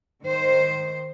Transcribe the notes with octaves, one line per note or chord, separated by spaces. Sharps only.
D#3 C5